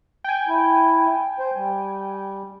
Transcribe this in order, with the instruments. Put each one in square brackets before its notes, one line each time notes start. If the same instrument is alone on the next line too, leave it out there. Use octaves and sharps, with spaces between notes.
[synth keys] G5 G#5
[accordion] E4
C5
G3